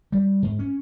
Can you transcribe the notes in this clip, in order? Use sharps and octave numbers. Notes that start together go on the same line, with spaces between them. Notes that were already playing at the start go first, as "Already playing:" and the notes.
G3
G#2
C#4